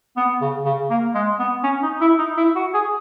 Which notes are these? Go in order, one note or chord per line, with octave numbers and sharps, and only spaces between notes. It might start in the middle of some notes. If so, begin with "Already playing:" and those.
B3
C#3
C#3
A#3
G#3
B3
C#4
D#4
E4
D#4
E4
F#4
G#4